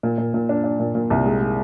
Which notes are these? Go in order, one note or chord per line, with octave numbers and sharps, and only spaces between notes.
A#2
A#2
A#2
D4
D4
A#2
A#2
C2
G#3
G#3